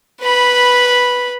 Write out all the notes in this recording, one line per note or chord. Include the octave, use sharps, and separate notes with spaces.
B4 B5